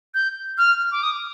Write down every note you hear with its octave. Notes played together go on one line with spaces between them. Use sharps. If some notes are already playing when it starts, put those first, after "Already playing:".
G6
F6
D6
D#6